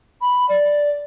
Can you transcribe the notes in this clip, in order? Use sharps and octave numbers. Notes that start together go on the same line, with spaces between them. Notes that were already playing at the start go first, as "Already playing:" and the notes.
B5
D5